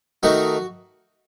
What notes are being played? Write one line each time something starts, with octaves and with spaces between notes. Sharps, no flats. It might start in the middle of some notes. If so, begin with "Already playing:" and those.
D#3 A3 D#4 F#4